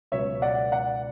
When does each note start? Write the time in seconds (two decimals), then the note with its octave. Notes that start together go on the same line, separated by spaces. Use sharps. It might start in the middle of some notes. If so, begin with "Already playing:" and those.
0.12 C#2 B2 F#3 C#5 E5
0.42 D5 F#5
0.72 D5 F#5